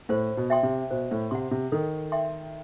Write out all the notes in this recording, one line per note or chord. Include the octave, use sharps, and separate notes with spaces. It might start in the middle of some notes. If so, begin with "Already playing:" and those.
A2 C5
B2
E5 G5 C6
C3
B2 C5
A2
C3 F#5 C6
C3
D#3 A4
E5 G5 C6